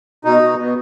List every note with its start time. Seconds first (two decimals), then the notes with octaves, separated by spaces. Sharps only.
0.25 B2 D#4
0.42 B2
0.58 B2